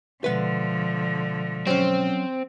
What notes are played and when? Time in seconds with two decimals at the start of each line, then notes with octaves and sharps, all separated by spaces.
0.24 B2 D3 F3 G#3 B4 E5 F#5
1.67 F#3 C4 C#4